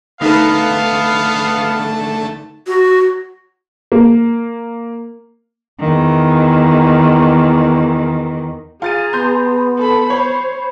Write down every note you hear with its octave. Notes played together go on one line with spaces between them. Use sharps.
D3 A3 B3 D#4 B4 F5 A5
F#4
A#3
E2 D#3
F4 G#4 A#5 A6 D#7
B3 C6 G6
A4 B5
C5 C#5 B5